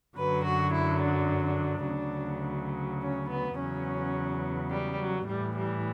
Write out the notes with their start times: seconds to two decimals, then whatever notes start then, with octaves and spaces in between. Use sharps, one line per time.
0.16 F#2 D3 F#3 B4
0.45 F#4
0.73 E4
1.02 D4
1.44 D4
1.86 D2 C#3 F#3
3.01 C#4
3.29 B3
3.57 E2 C#3 F#3 C#4
4.71 G3
4.99 F#3
5.27 A2 E3 G3
5.55 G3